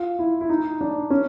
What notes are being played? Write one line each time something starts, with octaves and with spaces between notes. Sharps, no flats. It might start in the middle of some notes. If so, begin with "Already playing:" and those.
Already playing: F4
E4
E4
D#4
D4
C#4